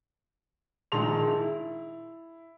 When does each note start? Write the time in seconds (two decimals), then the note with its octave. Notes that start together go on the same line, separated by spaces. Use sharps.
0.92 A#1 D#3 G#3 A5 C6 F7
1.27 E4